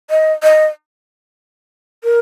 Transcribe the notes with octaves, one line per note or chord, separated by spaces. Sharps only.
D#5
D#5
A#4